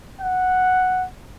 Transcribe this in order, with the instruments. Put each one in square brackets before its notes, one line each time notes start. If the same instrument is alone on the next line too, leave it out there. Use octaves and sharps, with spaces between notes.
[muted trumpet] F#5